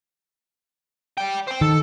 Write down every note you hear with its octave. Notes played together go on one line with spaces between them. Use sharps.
D5 G5
C5 G5
D#3 A4